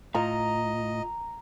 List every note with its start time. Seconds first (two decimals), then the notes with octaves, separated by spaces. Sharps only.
0.15 A2 F4 D#5 A#5